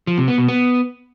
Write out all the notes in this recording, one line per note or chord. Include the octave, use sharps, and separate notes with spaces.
F3
C3
B3
B2
B3